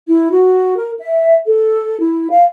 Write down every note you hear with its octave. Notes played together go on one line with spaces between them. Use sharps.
E4
F#4
A#4
E5
A4
E4
F5